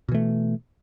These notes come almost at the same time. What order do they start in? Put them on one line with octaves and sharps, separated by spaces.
B2 E3 A3